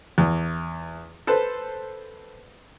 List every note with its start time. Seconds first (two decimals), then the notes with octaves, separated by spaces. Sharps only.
0.18 E2
1.27 A4 B4 C5